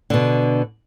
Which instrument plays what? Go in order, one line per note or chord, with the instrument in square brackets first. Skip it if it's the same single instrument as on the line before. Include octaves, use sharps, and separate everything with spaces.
[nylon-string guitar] B2 D3